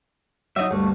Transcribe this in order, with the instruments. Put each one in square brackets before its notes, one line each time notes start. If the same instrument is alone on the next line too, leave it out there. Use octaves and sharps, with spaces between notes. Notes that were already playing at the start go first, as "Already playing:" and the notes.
[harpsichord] F#3 [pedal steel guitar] D#4 D#5 E5
[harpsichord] D2 G2 [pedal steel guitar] A3